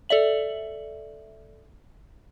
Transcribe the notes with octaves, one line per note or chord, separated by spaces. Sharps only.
A4 D5 E5 F#7